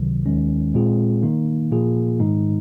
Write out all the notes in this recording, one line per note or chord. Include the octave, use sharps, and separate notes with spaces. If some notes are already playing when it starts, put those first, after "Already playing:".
Already playing: C#2 C3 D#3 F#3
D#2 D#3 G#3 C#4
A#2 G#3 C4 F4 G#4
D#3 A#3 D#4
A#2 F3 A#3 F4 G#4
G#2 D#3 G#3 D#4